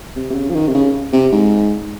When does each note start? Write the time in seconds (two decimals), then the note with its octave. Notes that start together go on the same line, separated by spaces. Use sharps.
0.16 C3
0.30 C3
0.35 C#3
0.49 F3
0.55 D#3
0.68 C3
0.74 C#3
1.13 C3
1.32 G#2